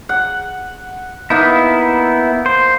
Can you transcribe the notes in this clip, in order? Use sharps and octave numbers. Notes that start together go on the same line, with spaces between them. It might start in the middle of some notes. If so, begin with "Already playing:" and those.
F#5
A#3 B3 D#4 E4
C5